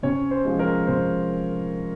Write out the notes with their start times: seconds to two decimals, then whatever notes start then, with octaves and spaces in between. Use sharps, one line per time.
0.03 C3 C#4 C#5
0.31 C5
0.44 F3 G#3
0.59 A#4
0.87 C3 C5